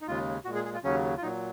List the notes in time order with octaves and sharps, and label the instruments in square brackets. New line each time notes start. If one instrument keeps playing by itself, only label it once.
[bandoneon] D#4
D#2 C#3 G#3 F4
A#2 G#3 F#4
G#4
G#4
F4
D#2 C#3 F#3 C#4
F4
A#2 F#3 D#4